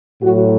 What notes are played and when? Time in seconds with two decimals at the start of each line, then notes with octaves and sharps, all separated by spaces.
0.22 A2 F#3 F#4